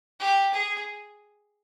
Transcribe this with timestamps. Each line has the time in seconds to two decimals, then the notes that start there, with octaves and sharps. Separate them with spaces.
0.20 G4
0.54 G#4